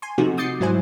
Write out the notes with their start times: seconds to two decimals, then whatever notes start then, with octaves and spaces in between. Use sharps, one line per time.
0.02 G#5 C6
0.18 C3 F3 A3 D#4 F#4
0.37 D6 D#6 G6 A6 C7 C#7
0.60 G#2 F#3 E4 C5 G#5